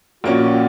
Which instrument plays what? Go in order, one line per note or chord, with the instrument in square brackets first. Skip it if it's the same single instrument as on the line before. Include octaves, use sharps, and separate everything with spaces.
[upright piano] A#1 A#2 A#3 C#4 [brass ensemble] F#4